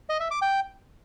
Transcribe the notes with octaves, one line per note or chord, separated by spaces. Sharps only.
D#5
E5
D6
G5